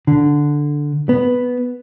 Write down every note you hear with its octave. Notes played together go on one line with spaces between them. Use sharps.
D3
B3